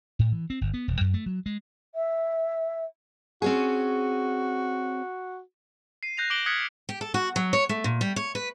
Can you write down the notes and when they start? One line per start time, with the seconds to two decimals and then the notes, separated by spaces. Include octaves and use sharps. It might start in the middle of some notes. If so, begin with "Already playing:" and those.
0.19 A2
0.32 E3
0.50 C4
0.61 G1
0.74 B3
0.88 D#1
1.01 F#2
1.14 A3
1.26 F#3
1.46 G#3
1.95 E5
3.42 C4 C#4 F#4 G#4
6.03 C7 D#7
6.17 F#6 G6 A#6 C7 F7
6.30 D6 F#6 D7 F#7 G7
6.46 D#6 F6 F#6 G#6 B6 C#7
6.89 G4
7.01 A4
7.14 F#4
7.36 F#3
7.53 C#5
7.69 A3
7.84 A#2
8.01 G3
8.16 C#5
8.35 B4